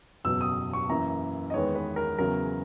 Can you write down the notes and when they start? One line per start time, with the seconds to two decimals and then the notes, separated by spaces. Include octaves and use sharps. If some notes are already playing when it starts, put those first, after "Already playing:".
0.24 F#1 E2 B2 F#3 E6
0.41 D#6
0.73 C#6
0.89 F#2 E3 A#3 A#5
1.50 D#5
1.54 E2 D#3 G#3 B3 C#5
1.75 B4
1.96 A#4
2.18 E2 C#3 F#3 A#4